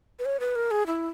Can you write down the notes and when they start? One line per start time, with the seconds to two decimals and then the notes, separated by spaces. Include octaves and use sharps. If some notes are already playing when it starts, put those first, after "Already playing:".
0.19 B4
0.25 C#5
0.40 B4
0.56 A#4
0.71 G#4
0.87 E4